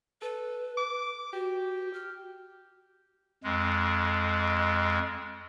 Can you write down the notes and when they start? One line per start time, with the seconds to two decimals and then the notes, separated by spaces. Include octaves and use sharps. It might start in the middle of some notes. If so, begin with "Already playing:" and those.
0.22 A4 B4
0.77 D6
1.33 F#4 G4
1.94 F6
3.44 F2 G#3